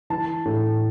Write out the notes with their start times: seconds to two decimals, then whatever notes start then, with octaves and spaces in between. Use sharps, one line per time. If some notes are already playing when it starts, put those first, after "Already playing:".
0.10 E3 A5
0.46 A2